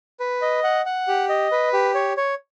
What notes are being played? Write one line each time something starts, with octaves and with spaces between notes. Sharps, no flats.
B4
D#5
F#5
F#5
G4
D#5
B4
G4
C#5
C#5